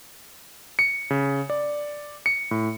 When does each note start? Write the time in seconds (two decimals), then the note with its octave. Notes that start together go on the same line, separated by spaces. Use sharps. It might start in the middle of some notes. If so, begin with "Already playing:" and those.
0.79 C#7
1.10 C#3
1.50 D5
2.26 C#7
2.51 A2